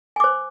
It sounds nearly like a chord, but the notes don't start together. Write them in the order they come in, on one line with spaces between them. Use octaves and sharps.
G#5 D6 C5